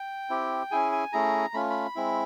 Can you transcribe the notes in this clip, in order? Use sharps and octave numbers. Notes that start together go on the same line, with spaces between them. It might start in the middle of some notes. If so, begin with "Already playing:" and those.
Already playing: G5
C4 E4 G4
C#4 E4 G#4 G#5
G#5
A3 C#4 E4 G#4 A#5
A3 C#4 F4 B5
B5
G#3 C4 E4